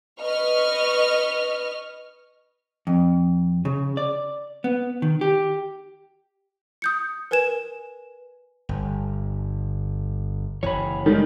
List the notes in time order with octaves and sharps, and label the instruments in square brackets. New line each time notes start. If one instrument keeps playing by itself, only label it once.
[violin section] B4 D#5 C#6 F6
[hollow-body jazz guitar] F2
C#3
D5
B3
D#3
G4
[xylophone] D#6 G6 C#7
A#4 B4 G#5 G#6 E7
[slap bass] G1
[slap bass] F#1 E3 [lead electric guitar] C#5 B5
[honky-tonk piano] D#3 [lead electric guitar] G3 G#3